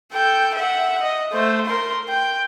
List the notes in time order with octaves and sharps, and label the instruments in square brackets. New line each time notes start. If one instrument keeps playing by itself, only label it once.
[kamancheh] A4 G5
E5 F#5
D#5
A3 C5
A#4 C6
G5